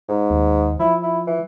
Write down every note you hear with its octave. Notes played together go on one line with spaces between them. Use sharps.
G#2
D#2
F3 E4
E4
E3